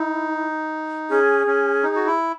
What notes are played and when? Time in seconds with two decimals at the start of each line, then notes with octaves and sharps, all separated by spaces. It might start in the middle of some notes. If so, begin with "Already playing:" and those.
Already playing: D#4 E4
1.10 C#4 G#4
1.47 C#4
1.83 D#4
1.96 F#4
2.07 E4